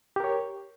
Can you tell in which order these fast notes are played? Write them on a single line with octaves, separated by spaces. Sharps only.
G4 A#4 C#5